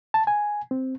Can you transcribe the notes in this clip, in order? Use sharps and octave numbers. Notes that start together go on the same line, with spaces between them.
A5
G#5
C4